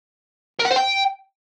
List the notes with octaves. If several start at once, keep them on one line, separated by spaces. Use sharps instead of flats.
A#4
F#5
C5
G5